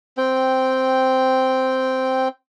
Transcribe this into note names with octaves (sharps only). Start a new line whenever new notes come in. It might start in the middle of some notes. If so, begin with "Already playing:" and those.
C4 G5